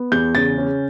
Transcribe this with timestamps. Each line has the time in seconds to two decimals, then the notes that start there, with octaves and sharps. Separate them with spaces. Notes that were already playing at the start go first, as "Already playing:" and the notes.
Already playing: B3
0.12 E2 G6
0.35 C#3 A6
0.58 C#4